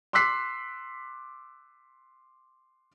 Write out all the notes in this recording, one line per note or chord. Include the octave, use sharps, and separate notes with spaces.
C6 D6 E6 F#6 B6 C7